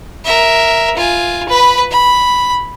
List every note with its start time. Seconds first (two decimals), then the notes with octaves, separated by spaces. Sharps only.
0.25 A#4 E5
0.97 F4 G#5
1.49 B4 B5
1.91 B5